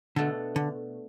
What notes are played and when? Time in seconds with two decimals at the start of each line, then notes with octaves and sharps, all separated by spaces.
0.16 B2 D3 A3 D4 A4
0.56 D3